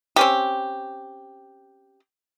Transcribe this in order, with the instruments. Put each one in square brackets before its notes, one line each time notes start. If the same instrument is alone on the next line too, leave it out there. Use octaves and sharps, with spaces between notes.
[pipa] C4 C#4 G4